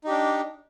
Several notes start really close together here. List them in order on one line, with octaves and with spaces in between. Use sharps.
D#4 G4 D4